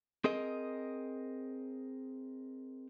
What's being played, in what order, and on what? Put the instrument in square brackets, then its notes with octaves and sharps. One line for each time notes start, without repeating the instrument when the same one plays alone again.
[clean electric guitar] C4 G#4 A#4 D#5